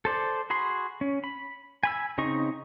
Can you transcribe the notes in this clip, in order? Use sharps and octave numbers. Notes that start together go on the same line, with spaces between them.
A4 C5 D5
F#4 G#4 B5 C6
C#4
B5
G#5 B5 E6
C#3 C4 D#4 D#5 C#6